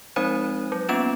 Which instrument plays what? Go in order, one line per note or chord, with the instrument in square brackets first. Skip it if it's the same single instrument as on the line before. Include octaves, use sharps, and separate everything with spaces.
[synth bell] F3 G#3 C4 D#4 C5
F#3
A#3 B3 C#4 F4 E7